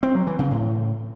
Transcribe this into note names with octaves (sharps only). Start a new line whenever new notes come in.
C4
F#3
E3
C#3
A2